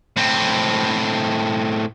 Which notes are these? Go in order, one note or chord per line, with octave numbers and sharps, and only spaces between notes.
A2 C4